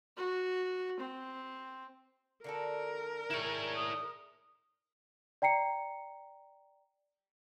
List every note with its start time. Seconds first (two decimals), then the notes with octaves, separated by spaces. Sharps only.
0.17 F#4
1.00 C4
2.44 D3 F#4 A4 A#4
3.31 D#3 D4 E4 G#4 C#5
3.75 D#6
5.42 D5 G5 A#5 C7 C#7